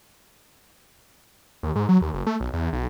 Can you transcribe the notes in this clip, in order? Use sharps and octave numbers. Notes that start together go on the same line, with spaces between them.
D#2
G#2
F#3
D#2
F#1
A3
B1
E2
B1